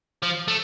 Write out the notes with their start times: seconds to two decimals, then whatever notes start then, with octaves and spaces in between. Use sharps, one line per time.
0.23 F3
0.48 A3